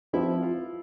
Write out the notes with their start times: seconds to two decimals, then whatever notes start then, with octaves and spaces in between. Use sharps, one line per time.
0.13 F3 C4 E4 F4 B4
0.43 F4